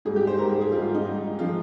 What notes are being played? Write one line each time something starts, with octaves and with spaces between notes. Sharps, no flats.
G#2 G3 G#4
G4
C5
G#2 G3 A#4
G#4
G#4
G#2 G3 F4
F4
D#4
G#2 G3
F3 G#3 F4